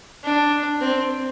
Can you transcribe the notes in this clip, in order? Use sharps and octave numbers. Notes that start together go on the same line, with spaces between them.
D4
C4